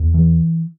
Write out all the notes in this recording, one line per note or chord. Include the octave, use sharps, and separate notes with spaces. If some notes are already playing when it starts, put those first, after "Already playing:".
Already playing: E2
E3